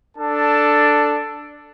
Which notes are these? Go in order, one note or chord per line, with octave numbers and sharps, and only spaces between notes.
D4 A4 A5